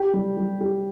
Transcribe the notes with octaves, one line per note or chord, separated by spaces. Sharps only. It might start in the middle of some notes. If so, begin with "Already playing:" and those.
Already playing: G4
G3
G3
G4